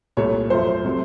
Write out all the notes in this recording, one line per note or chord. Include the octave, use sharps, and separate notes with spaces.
C2 A#2 A3 C#5
F#2 F3 A3 C5
C3 F#3 A3